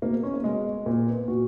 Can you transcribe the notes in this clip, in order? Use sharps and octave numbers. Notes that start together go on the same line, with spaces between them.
B2 A#3
B3
C#4
A#3
B2 G#3
A#2 A#3
B3
A#2 F#4